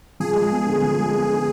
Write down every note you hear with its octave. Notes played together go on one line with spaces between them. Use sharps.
F3 G#4
G#3
B3
D3
F3
G#3
B3
D3